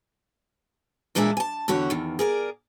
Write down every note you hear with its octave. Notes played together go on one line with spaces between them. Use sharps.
E2 A#2 G#3 D4 D5 E5
G#5 A5
E2 D3 F#4 G4 C#5
E2 D#3
G#4 A#4 D5